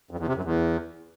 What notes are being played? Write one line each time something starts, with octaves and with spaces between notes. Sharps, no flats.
F2
E2
C3
F#2
E2